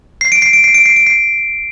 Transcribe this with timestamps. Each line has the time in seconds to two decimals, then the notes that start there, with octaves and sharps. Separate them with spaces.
0.21 C7
0.32 D7
0.42 C7
0.53 D7
0.64 C7
0.74 D7
0.86 C7
0.96 D7
1.07 C7